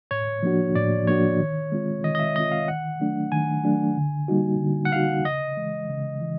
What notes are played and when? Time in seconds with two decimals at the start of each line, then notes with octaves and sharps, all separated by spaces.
0.11 A2 C#5
0.43 F3 A#3 D4 F#4
0.75 A2 D5
1.07 F3 A#3 D4 F#4 C#5
1.39 D#3
1.72 G#3 C4 F4
2.04 D#3 D#5
2.15 D#5
2.19 E5
2.36 G#3 C4 F4 D#5
2.52 F5
2.68 D#3 F#5
3.00 F#3 A3 D4
3.32 D#3 G#5
3.64 F#3 A3 D4
3.97 D3
4.28 G3 A#3 D#4 F#4
4.61 D3
4.85 F#5
4.92 G3 A#3 D#4 F#4 F5
5.25 C#3 D#5
5.57 E3 G#3
5.89 C#3
6.21 E3